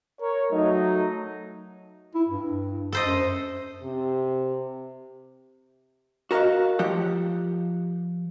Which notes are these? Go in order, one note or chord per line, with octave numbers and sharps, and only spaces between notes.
A#4 C#5
F#3 A3 D#4
E4
G2
A4 C5 D#5
F#2
C3
F#4 A#4 D#5 F5 F#5
F3 G4 F#5